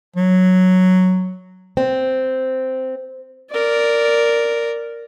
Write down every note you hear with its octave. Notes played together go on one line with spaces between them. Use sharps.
F#3
C4
A#4 D5